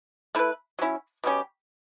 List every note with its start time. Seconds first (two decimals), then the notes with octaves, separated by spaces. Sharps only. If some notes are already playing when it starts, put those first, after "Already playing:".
0.35 A3 E4 B4
0.79 F#3 C#4 E4
1.24 B2 G3 C#4 G4